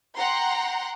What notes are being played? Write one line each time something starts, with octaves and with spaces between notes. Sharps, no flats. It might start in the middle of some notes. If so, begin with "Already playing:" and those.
F#5 G5 A#5 C6